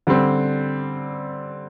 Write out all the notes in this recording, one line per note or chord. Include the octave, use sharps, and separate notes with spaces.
D3 G3 C4